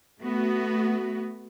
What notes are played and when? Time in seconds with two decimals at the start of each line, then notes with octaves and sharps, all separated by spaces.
0.22 A3 B3 F#4